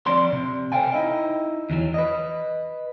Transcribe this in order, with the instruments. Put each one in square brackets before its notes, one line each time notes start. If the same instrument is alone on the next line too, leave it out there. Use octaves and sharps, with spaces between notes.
[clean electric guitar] F3 C4 D5 C6
C3
A4 C5 D5 F5 G5 G#5
D#4 E4 D#5
E2 E3 F#3
B4 D#5